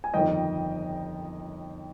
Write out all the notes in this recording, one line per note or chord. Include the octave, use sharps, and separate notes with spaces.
G#5
G1 F2 D#3 D#5 G5